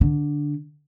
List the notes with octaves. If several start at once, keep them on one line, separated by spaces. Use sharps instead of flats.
D3